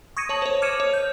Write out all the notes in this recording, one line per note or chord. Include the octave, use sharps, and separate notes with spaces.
C#6 D#6 G#6 A#6 C#7 D#7
C#5 A5 F#7
C5 C#5
D6 F6 G#6 C#7 D#7 E7
C#5
G6